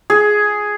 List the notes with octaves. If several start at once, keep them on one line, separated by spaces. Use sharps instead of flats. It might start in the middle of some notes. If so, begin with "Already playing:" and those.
G#4